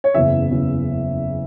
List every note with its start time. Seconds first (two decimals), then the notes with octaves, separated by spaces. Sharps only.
0.04 C#5
0.14 F#1 E2 C#3 E5
0.51 F#1 E2 C#3